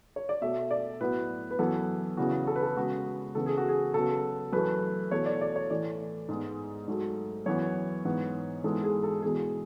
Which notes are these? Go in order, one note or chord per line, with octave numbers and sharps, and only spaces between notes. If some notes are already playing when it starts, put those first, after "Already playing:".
C#5
D5
B2 A3 E5
D5
A2 F#3 B3 B4
B4
F#2 E3 B3 A4
E2 C#3 E3 B3 F#4
A4
B4
A4
C#3 G#3 B3 F#4
C#3 E3 B3 A4
G#4
F#4
G#4
C#3 F#3 B3 A4
F#2 E3 A3 B4
E2 B2 F#3 A3 C#5
D5
D5
C#5
A2 E3 A3 D5
G#2 G#3 B3
G#2 F#3 A3
F#2 E3 B3 C#5
G#2 E3 B3
G#2 E3 G#3 B3 A4
G#4
A4
E2 B2 G#3 G#4